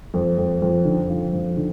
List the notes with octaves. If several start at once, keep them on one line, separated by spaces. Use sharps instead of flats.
F2
F2
F2
D3
F3
F2
D3